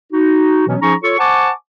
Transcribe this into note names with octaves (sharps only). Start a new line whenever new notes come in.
D#4 F#4
B2 E3 F#3 B3 C#4
F3 C#4 D#4 G#4 A#5 C#6
F4 A4 C#5 C#6
C5 F#5 G#5 A5 C#6 D6